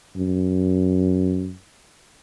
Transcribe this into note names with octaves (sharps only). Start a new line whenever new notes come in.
F#2